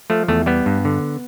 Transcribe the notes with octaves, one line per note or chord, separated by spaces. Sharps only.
F3 A3
E2 A3
G3 B3
G2
D3